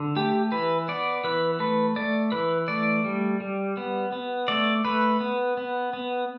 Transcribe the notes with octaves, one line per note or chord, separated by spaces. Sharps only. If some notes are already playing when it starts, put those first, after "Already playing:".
Already playing: D3
A3 G4
E3 B4
B3 D5
E3 B4
A3 B4
A3 D5
E3 B4
A3 D5
G3
G3
B3
B3
A3 D5
A3 B4
B3
B3
B3